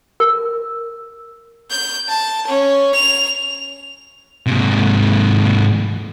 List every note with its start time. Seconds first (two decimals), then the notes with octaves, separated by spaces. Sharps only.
0.20 A#4
1.71 G6
2.08 A5
2.47 C#4
2.95 F7
4.47 G#2 C3